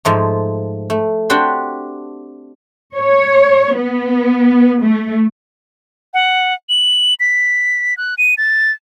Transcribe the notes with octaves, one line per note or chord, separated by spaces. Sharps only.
G#2 F3 A3
A3
C4 D4 F#4 G4 B5 C6
C#5
B3
A3
F#5
F#7
B6
F#6
D#7
A6